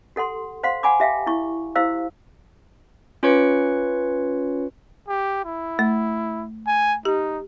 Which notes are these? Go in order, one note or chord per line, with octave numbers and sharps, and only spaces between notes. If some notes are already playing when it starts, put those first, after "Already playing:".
G4 A4 F#5 C6
C5 F5 F#5 C6
F#5 G#5 B5 D6
G4 E5 F5 G5
E4 C#6
E4 G4 C5 F5 E6
C#4 F4 B4 C#5 C#6 C#7
G4
E4
A3
G#5
D#4 G4